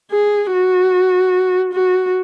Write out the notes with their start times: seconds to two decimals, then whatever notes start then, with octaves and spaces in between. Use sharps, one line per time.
0.11 G#4
0.52 F#4
1.73 F#4